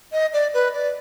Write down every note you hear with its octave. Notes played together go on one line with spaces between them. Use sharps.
D#5
D5
B4
D5